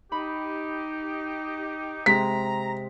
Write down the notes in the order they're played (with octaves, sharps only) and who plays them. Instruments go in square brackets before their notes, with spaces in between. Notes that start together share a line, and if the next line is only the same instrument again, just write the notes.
[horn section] D#4 G4 [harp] B5
[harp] C3 G#3 [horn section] A#5 [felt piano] B6